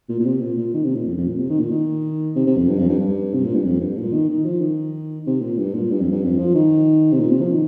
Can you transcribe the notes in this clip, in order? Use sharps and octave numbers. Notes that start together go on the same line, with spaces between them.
A#2
A#2
C3
A#2
A#2
D#3
C3
A#2
F2
F2
A#2
C3
D#3
A#2
D#3
C3
C3
F2
G2
F2
G2
G2
C3
A#2
G2
F2
G2
A#2
D#3
D#3
F3
D#3
C3
A#2
G2
A#2
G2
F2
G2
F2
F3
D#3
C3
A#2
C3
F3
D#3